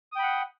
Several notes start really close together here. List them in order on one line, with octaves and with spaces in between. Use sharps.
D#6 G5 B5 F#5